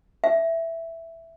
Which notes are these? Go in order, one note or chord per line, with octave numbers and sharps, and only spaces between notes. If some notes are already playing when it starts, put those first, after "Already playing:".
E5